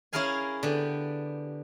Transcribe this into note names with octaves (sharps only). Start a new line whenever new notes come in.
C#4 E4 G#4 A#4 F5 G#5
D3 B3 G4